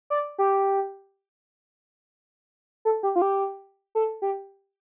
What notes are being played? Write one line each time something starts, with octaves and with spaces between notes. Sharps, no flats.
D5
G4
A4
G4
F4
G4
A4
G4